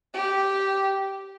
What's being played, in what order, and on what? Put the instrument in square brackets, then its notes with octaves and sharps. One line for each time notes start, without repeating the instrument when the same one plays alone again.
[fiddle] G4